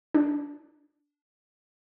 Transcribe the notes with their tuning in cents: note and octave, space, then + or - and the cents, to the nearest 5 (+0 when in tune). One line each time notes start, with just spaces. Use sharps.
D4 -10